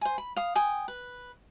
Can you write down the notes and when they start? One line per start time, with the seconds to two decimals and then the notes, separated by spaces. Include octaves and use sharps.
0.01 C5 G#5
0.18 B5
0.36 F5 D#6
0.55 G5 G#5 D#6
0.88 B4